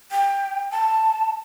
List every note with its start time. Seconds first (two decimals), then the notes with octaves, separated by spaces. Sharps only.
0.11 G5
0.71 A5